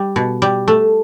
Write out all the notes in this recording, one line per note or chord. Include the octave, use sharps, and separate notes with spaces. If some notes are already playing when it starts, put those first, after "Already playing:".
Already playing: G3
B2
G3
A3